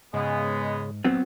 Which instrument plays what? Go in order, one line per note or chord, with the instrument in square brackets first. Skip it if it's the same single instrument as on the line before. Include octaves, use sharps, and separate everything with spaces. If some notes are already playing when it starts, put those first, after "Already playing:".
[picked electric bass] G#2 [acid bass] C#3 [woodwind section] G#3 B3
[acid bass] D#1 [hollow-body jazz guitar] F#3 B3 C4